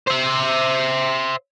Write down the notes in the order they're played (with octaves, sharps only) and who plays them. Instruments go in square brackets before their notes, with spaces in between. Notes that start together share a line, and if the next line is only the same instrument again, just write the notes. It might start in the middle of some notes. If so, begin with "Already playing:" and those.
[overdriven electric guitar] C5 E5